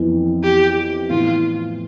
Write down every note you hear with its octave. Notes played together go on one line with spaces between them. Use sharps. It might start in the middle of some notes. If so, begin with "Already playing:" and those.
Already playing: F2 E3 B3 E4
G4
A2 E3 B3 F4